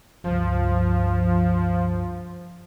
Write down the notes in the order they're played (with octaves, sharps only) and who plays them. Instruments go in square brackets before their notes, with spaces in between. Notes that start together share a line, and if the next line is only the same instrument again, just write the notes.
[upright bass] C#2 G2 [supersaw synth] F3